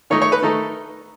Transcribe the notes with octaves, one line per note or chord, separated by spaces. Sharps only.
D#3 A3 D#4 C#5
C#5
B4
D#3 A3 D#4 A4